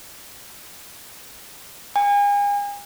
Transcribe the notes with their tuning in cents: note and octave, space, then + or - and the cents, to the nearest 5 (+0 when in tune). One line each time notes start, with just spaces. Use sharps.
G#5 -40